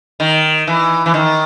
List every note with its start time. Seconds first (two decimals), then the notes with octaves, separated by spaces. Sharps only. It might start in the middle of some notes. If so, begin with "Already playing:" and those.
0.20 D#3
0.67 E3
1.06 E3
1.14 D#3